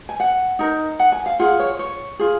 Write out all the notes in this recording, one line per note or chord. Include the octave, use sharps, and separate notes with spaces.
G#5
F#5
D#4 A#4
F#5
G#5
F5
F4 G#4 F#5
C#5
C#5
F4 G#4